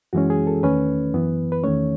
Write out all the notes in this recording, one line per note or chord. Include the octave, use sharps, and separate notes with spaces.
F#2 E3 G#3 C#4 F#4
G#4
A4
E2 D#3 A3 C#4 B4
F#2 E3 B3
B4
E2 D#3 A3 C#4 C#5